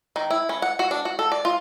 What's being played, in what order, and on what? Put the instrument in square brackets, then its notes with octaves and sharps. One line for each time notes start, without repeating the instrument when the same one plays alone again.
[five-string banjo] D#3
E4
C#4
F#5
F#4
D4
F#4
A4
D5
F4